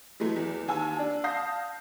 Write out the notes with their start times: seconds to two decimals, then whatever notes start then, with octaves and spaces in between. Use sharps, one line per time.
0.20 E3 F#3 G#3 A3
0.36 E2
0.68 D#2 G#5 A5 E6
0.99 D4
1.24 F5 A5 D#6 G6 A#6 C7